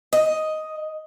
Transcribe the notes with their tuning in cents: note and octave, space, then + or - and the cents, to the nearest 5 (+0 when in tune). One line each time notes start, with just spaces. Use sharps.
D#5 +5